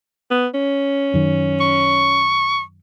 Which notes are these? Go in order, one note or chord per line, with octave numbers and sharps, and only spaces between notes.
B3
C#4
F#2 D#3
C#6